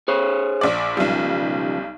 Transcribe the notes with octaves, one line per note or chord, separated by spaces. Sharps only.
G#4 C5 C#5
A#1 D5
B1 C#3 F3 G3